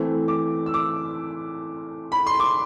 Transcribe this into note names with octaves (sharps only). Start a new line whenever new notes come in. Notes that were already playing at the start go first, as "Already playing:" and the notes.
Already playing: E3 A3 C4
D6
E6
D6
B5
C6
D6